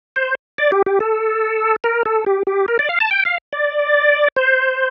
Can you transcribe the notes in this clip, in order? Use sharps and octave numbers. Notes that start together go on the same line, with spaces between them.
C5
D5
G4
G4
A4
A#4
A4
G4
G4
A#4
D5
F5
A5
G5
F5
D5
C5